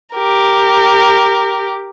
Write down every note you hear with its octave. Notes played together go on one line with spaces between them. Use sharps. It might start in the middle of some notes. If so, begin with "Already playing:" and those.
G4 A#4